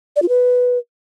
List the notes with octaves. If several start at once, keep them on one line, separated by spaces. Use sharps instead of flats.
D5
F4
B4